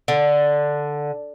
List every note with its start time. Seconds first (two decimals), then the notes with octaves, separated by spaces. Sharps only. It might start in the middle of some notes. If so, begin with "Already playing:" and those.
0.08 D3